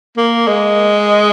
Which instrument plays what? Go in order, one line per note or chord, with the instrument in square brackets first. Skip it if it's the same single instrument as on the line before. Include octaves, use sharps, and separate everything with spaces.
[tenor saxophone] A#3
G#3